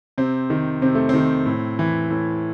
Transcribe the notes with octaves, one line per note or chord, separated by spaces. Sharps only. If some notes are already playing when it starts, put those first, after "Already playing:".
C3 C4
D#3
C3 C4
A3
D#3 C4
A2
E3
A2